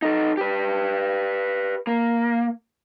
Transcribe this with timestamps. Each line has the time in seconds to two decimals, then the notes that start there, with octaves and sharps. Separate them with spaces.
0.02 D#4 A4
0.37 G4 B4
1.87 A#3